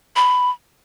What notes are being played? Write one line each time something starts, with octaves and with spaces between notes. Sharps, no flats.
B5